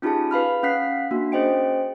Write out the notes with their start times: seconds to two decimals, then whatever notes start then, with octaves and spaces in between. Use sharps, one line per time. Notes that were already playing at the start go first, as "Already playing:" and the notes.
0.02 C#4 D#4 F4 G4 G#4 A5
0.31 B4 F5 B5 F6
0.63 C#4 F5 F#5 F#6 B6 C7
1.11 A#3 D4 F#4
1.32 C#4 G#4 C5 D#5 G5 D7